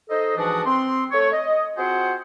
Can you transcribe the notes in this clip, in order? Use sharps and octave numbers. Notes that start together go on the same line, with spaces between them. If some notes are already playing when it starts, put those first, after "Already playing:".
D#4 A4 C5 D#5
G#2 E3 F3 D4 F#4 D#6
C4 C6
A3 C#5
D#5
C4 F4 F#4 G#4 C5 F#5